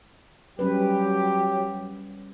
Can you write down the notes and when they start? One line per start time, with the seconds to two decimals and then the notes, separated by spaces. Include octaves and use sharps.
0.59 F#3 G3 C#4 G4 B4